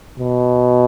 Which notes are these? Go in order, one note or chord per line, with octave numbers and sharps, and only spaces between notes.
B2